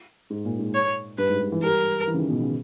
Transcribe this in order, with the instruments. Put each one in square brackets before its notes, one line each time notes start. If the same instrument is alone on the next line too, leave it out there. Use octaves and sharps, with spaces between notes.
[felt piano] G#2
A#2
G#2
[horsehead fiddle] C#5
[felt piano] G2 [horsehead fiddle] B4
[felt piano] G#2
G#2
E3
[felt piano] G3 [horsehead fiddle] A#4
[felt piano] E3
C#3
D#3
B2
C#3